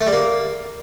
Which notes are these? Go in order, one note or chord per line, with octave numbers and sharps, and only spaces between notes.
A3
G3
A#3